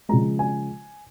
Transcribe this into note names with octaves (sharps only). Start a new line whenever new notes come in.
C#3 F3 G#3 A#5
G#5